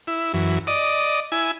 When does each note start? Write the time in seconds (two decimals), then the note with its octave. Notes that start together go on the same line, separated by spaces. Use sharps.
0.07 E4
0.34 F#2 E3
0.67 D5 D#5
1.32 E4 G#5